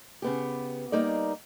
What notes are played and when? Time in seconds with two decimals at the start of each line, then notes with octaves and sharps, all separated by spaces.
0.22 C#3 B3 G4
0.92 G3 A#3 D#4 A#4 D5